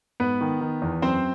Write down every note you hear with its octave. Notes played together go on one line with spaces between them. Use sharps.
G#2 B3 B4
D#3
D#3
E2
F#2 C4 C5